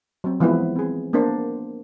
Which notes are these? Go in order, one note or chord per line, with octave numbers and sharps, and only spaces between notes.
F#3 C4
E3 F3 G#3 B3 E4 B4
C4 G#4
A#3 B3 D4 A#4 C5